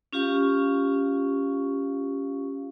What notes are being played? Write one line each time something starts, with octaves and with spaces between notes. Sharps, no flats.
C#4 F4 G4 F5 C#6